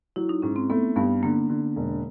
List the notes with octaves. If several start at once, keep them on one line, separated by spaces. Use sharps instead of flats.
F#3 E4
D#4
G#2 C#4
C4
A3 B3
G2 B3
D3 A#3
D3
E1